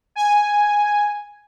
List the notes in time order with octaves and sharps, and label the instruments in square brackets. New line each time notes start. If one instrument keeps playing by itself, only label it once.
[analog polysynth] G#5